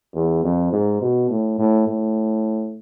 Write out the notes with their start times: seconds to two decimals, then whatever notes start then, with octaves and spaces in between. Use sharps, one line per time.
0.15 E2
0.44 F2
0.72 G#2
1.01 B2
1.29 A2
1.59 A2
1.87 A2